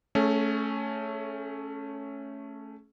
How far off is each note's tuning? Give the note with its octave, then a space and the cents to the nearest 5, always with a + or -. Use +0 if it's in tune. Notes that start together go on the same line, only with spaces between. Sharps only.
A3 +0 C#4 +0 G#4 +35